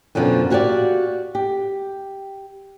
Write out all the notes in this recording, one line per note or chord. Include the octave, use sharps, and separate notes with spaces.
F#2 B2 D3 F3 B3 C4
E4 F#4 G4 B4 D5 F5
G4